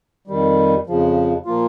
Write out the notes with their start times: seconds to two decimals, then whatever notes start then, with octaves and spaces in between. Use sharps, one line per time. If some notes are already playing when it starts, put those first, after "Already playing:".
0.27 F2 D#3 G3
0.87 F2 C#3 F3
1.46 A#2 F3 A#3 F4